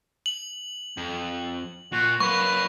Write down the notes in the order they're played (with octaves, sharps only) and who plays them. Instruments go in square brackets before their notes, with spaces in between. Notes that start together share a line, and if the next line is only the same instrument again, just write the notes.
[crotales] F#7
[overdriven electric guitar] F2
[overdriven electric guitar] A#2 [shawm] F#4
[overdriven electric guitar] F#3 A#3 [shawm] B4 [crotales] C#6